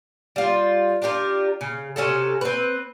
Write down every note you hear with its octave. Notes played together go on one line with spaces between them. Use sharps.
G3 F4
D4 F4 G4 A#4
C#3
C3 C#4 F#4 A4
C4 B4